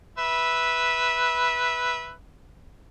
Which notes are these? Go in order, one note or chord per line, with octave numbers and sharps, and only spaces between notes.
B4 E5